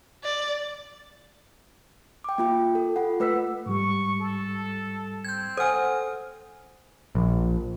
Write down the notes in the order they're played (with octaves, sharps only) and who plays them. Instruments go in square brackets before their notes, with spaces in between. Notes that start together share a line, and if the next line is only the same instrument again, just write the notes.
[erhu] D5
[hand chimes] G5 D6
A#3 F4 G5
A4
F4 F#5
A3 B4 E6 B6
[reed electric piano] G#2 G3 [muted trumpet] C#6
[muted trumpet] A4
[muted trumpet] C4 [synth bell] G6 G#6
[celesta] A4 F#5 G#5 [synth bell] C5 F6 [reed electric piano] D#6
[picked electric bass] A#1